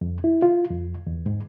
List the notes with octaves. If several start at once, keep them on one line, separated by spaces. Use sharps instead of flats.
F2
E4
F4
F2
E2
G#2